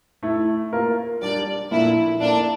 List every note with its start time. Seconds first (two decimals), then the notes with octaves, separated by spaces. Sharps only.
0.23 A3 E4 A4
0.73 A#3 F4 A#4
1.22 G3 D4 G4 D5
1.71 A#2 F3 A#3 D4 E4 A4
2.21 A#3 D4 E4 A4 D5